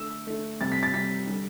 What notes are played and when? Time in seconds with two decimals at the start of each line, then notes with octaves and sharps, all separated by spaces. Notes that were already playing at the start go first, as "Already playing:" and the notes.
Already playing: D3 A3 E6
0.27 D3 A3
0.61 C3 G3 A6
0.72 B6
0.83 A6
0.94 C3 G3 B6
1.27 D3 G3